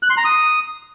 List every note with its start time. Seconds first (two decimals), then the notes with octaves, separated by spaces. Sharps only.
0.03 F#6
0.10 C6
0.17 A#5
0.25 D#6